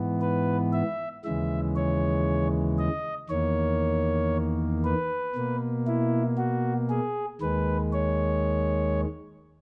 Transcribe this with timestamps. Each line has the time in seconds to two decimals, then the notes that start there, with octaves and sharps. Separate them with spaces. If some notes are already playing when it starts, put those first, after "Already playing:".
Already playing: G#2 E3 B3
0.21 B4
0.73 E5
1.24 D#2 C#3 E3 G#3 E5
1.76 C#5
2.78 D#5
3.29 E2 D#3 A#3 C#5
4.84 B4
5.35 B2 A#3
5.87 E4
6.37 F#4
6.90 G#4
7.41 D#2 D#3 G#3 B4
7.93 C#5